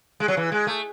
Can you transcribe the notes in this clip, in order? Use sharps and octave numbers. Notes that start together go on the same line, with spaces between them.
G#3
F#3
E3
G#3
A3